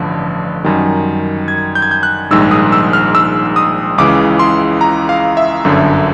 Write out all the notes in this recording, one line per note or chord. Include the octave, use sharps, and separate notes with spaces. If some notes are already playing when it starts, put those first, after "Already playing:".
Already playing: A1 G2 D3 F3
F#2 D#3 G3
G#6
G6
G#6
G6
F#6
A#1 G#2 D#3 G3 E6
D#6
E6
F6
E6
D#6
C#2 C#3 E3 D6
C6
A#5
F5
E5
G1 F#2 D3